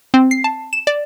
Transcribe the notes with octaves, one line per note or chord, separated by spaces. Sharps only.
C4
C7
A5
E7
D5